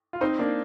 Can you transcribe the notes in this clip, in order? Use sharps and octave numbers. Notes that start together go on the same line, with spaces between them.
F4
C4 D#4
A#3 D4